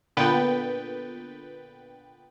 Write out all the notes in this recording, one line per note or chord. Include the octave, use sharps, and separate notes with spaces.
A#2 D3 B3 B4 G5 A6